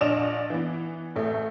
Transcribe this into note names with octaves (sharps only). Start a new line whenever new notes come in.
A#1 D4 D#5 D7 E7 F7
E3 B3
A1 A3